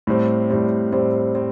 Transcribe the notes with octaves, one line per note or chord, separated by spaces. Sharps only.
A2 G3 C4
A2 G3 C4
A2 G3 C4
C4